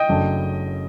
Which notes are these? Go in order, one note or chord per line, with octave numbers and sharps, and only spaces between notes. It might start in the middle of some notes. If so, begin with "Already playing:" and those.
Already playing: D#5 G5
F#1 F#2 F#3 A3 D4